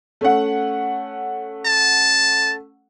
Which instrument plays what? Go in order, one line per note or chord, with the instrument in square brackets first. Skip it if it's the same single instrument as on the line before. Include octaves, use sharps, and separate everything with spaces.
[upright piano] A3 C#4 F#5
[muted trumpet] A5